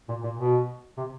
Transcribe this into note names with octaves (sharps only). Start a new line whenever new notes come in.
A#2
A#2
B2
C3